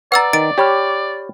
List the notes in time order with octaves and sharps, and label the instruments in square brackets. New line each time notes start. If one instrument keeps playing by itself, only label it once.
[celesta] B4 A#5 [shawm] D5 [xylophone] F#5 E6 A6
[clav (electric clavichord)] D#3 [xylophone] A6 D7
[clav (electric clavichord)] G4 C#5 [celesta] G5 B5 F6